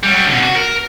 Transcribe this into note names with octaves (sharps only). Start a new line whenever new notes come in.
F#3 G3
B2 D3
F#4
A#4